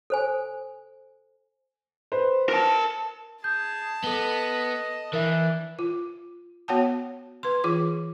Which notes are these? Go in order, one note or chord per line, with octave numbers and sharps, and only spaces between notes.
A4 C5 G#5
B4 C5
A#4 A5
G#4 A5 G6
B3 A4 D#5 G7
E3 D4 A#4 E5
F4
B3 F#4 C#5 F#5 G5 A5
B4 C6
E3 F4 G#4 D6